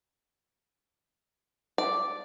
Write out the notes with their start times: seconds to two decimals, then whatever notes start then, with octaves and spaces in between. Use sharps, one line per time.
1.78 D5